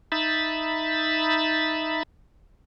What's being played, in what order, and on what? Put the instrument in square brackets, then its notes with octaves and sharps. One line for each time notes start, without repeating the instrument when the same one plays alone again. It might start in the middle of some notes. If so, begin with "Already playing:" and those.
[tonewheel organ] D#4 E5 B5 A6